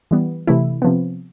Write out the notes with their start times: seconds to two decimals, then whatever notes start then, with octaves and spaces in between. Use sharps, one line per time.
0.11 E3 G3 B3
0.47 C3 E3 A3 E4
0.82 C3 F3 B3